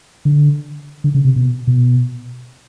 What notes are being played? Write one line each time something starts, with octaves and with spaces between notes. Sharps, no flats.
D3
D3
C#3
C3
B2
B2